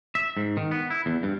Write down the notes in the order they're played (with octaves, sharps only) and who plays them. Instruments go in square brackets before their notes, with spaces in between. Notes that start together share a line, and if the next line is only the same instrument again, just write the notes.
[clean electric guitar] E5
G#2
D#3
B3
E4
E2
G2